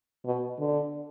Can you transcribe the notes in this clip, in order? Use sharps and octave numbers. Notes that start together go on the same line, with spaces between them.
B2
D3